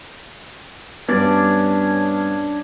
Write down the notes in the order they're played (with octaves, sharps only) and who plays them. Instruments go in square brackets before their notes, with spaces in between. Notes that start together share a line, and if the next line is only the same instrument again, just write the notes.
[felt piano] G2 G3 B3 [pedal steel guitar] C#4 D4 D5